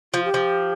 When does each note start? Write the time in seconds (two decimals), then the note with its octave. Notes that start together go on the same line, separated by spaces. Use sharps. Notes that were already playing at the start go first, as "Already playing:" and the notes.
0.13 F3 F4
0.24 G4
0.34 F3